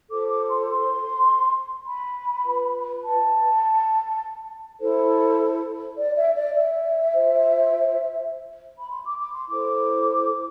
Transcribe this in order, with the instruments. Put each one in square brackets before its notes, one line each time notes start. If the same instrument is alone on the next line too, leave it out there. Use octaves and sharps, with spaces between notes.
[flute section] F4 A4 C5 D6
D6
C6
C6
B5
F4 B4
A5
E4 A4 C5
D5
E5
D5
E5
F4 C5
B5
C6
D6
D6
C6
E4 A4 C5 D6